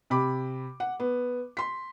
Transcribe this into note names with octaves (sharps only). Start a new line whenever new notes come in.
C3 B5 D6
F#5
B3
C6 B6